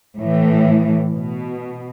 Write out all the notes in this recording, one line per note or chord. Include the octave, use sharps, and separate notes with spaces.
A2 E3
B2